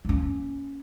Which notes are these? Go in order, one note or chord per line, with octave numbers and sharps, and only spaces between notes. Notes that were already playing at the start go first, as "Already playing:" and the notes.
A#3 C#4